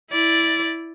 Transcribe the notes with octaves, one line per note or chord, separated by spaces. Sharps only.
E4 D5